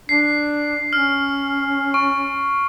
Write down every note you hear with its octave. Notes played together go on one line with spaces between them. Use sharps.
D4 C7
C#4 F6
C#6